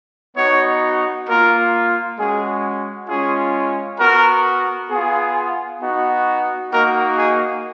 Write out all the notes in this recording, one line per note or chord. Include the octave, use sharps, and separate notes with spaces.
B3 D#4 F#4 C#5
A#3 F4 A#4
G#3 C#4 F#4 G#4
G#3 C#4 F4 G#4
B3 F#4 A#4
B3 F4 G#4
B3 D#4 F#4
A#3 D#4 F#4 A#4
G#4